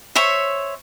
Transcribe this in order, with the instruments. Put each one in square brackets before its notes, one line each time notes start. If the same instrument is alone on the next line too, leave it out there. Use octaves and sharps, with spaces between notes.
[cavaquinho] C5 C#5 E5 C#6